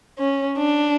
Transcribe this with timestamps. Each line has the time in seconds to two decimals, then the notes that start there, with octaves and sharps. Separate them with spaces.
0.18 C#4
0.58 D4